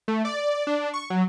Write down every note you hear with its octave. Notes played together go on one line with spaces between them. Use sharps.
A3
D5
D4
C#6
F#3